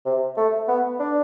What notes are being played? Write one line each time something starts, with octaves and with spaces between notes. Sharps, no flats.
C3
A3
B3
D4